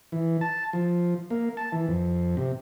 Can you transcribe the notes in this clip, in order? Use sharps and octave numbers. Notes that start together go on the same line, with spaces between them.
E3
A5
F3
A#3
A5
E3
F2
C3